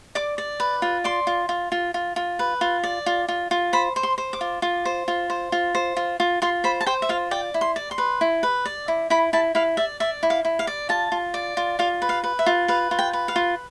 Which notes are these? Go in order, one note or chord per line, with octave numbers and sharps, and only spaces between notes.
D5 D6
D5
B4
F4
D5 C6
F4
F4
F4
F4
F4
B4
F4
D5
F4
F4
F4
C5 B5
C5
C6
C5
D6
F4
F4
C5
F4
C5
F4
C5
F4
F4
F4 C6
C5 B5
A5
C5 G5
E5
F4 F5
D5 G5
E4
C6
D5
C6
B4
E4
B4
D5
E4
E4 B5
E4 A5
E4 F5
D5 E5
D5 E5
E4
F5
E4
F5
D5
F4 A5
F4
D5
F4
F4 F5
B4
F5
B4
E5
F4
B4 F5
F4
G5
B4
F5
F4